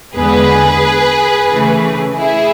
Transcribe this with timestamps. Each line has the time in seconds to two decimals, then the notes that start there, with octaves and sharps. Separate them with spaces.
0.16 E2 D3 G#3 B3 G#4 B4
1.50 C#3 E3 A3
2.16 E4 G#4